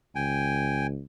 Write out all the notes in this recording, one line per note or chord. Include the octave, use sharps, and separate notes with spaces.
C#2 G5 G#5